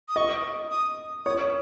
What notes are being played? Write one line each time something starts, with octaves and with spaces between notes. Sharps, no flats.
D#6
D#5 C#6
D#6
C#5 D#6